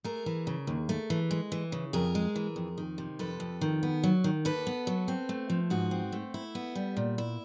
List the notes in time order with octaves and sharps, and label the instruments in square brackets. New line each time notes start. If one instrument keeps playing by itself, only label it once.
[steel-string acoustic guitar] A3 G#4 A#4
E3
C#3
D#2
A3
E3
G#3
E3
C#3
F2 G#4 A#4
G#3
E3
F2
D#3
C3
F2 A4 B4
F2
D#3
B3
F#3
D#3
D#2 A4 B4
B3
F#3
C4
A3
F3
G#2 F#4 G#4
C4
A3
E4
B3
G3
A#2
E4